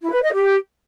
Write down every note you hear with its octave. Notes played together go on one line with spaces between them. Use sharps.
E4
B4
D#5
G4